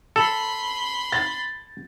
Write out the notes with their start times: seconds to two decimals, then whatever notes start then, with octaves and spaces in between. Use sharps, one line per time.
0.16 A4 B5 C6
1.12 A6